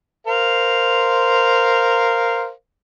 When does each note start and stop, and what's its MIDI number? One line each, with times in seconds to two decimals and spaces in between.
0.27 2.50 70
0.27 2.50 72
0.27 2.50 77